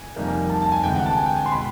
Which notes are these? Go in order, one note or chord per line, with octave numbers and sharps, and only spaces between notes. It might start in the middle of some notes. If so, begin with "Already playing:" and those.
Already playing: G#5
F2 C3 D#3 G3 A#3
A5
A5
G#5
D2 C3 E3 G#3 G5
F#5
A5
G#5
G5
G#5
C6
B2 G#3 B5